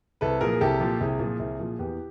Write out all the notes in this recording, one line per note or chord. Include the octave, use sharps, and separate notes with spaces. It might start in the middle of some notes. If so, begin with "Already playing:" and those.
C2 A4 B4
A#2 F3 G#4 A#4
C2 G4 A4
A#2 F3
C2 G#4
A#2 F3
C2
A#2 F3
E2 G4